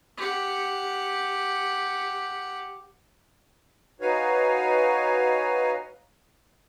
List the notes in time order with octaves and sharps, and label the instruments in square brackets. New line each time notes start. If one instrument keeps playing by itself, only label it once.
[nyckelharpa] G4 F#5
[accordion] D#4 F#4 B4 C#5 F5 G#5